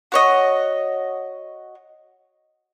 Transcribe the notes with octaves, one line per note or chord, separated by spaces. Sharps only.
F#4 C#5 D#5